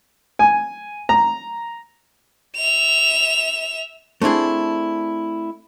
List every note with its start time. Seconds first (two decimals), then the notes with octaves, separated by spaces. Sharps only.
0.39 G#5
1.09 A#5
2.57 E5 F7
4.22 A3 C4 D4 E4 G#4